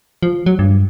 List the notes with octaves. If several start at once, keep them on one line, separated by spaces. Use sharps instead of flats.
F3
F#3
G2